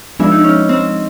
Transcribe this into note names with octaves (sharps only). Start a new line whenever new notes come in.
F3 G#3 B3 D4 E4
D#4
C#4
C4